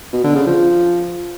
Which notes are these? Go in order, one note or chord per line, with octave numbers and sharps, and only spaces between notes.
B2
D3
C#3
F3